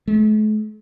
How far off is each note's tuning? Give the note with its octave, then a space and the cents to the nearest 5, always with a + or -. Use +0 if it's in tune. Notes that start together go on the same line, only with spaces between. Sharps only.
A3 -45